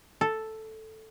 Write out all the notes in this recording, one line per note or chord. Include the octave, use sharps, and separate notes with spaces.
A4